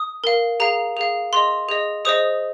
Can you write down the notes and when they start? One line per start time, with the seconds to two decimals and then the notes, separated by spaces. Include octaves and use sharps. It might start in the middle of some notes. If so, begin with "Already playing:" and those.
Already playing: D#6
0.24 A#4 F5
0.60 G#4 F5 A#5
0.97 G#4 F5
1.33 G#4 D#5 C6
1.69 G#4 D#5
2.05 G#4 C5 D#5 D#6